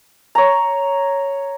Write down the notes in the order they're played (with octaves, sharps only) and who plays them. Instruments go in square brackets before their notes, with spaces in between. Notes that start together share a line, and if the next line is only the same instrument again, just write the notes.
[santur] C#5 A#5